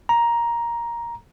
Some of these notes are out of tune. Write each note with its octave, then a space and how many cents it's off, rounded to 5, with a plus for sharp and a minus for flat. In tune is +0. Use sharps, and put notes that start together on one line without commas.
A#5 +10